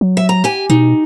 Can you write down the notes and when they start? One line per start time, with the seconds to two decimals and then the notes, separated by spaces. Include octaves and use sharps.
0.01 F#3
0.17 E5
0.29 A#5
0.44 G4 G#5
0.70 B2 D#4